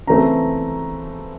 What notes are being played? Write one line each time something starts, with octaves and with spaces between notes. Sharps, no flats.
C#3 E3 A3 C4 A#5